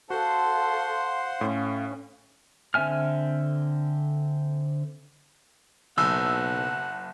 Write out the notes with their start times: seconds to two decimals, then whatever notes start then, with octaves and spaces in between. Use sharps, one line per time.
0.10 F#4 A4 C5 F5 F#5 C6
1.41 A2 C#4
2.74 D3 C4 E5 G#5 F6
5.98 F#1 B1 F#5 E6